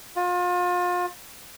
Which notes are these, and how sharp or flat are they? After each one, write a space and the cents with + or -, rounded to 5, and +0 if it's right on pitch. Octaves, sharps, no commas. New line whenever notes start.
F4 +35